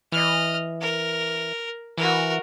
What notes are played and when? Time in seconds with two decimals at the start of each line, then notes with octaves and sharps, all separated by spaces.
0.12 E3 D#5 F6
0.81 A#4
1.98 E3 F#4 A#4